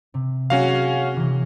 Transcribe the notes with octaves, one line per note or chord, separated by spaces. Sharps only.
C3
F#3 A#3 C#4 F#4 G#4 F5
C3 E3